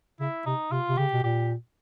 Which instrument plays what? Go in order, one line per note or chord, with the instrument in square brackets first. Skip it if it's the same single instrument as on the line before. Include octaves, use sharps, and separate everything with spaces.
[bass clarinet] C#3 [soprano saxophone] E4
[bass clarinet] C3 [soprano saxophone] D#4
[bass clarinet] C3 [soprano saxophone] F4
[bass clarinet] C3
[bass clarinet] C#3 [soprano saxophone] G4
[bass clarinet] B2
[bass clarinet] A#2 [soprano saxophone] G4